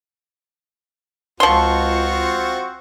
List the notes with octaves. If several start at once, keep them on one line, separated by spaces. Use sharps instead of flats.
C#2 F3 C4 F4 F#4 C5 C6 C#6